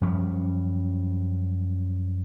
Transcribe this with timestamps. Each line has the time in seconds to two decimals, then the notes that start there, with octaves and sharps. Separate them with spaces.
0.01 F#2 F3 G3 C#4